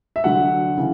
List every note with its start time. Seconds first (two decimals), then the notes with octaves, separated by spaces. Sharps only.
0.16 E5
0.24 D2 D3 F#3 F#5
0.77 C#3 E3